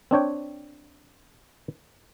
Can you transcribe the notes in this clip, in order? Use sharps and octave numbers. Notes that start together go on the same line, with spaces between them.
C4 D4 C#5 G5